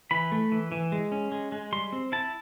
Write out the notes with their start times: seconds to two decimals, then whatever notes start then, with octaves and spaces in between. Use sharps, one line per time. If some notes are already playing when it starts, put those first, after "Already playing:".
0.11 E3 B5
0.32 A3
0.52 E3
0.72 E3
0.92 G#3
1.12 C#4
1.32 G#3
1.52 G#3
1.72 G3 C6
1.92 C4
2.12 E4 A5